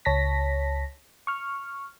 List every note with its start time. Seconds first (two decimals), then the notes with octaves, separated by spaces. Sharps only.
0.05 C#2 C#5 A5 A#6 B6
1.27 C#6 F6